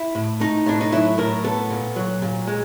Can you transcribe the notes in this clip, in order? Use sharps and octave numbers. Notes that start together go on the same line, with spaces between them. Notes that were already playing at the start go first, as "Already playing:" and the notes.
Already playing: E4
A2
A3 D#4
A2 D4
D#4
F#3 E4
A2 A#4
B3 A4
A#2
F#3
A#2
G#3